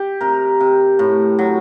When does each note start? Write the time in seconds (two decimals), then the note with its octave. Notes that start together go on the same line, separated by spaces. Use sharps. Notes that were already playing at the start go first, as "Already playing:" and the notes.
Already playing: G4
0.21 C3 A#4
0.60 C3
0.99 A2
1.39 F#3